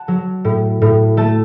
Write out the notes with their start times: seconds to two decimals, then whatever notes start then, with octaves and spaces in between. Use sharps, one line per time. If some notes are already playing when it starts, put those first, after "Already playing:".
Already playing: F#5 A5
0.08 F#3
0.44 A2
0.82 A2
1.17 A3 A5